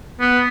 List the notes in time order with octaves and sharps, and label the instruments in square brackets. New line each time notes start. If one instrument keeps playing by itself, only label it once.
[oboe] B3